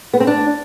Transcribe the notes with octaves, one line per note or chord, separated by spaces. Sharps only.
B3
C4
D4